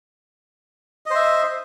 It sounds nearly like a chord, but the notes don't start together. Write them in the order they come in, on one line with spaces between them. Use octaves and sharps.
D#5 C5 E5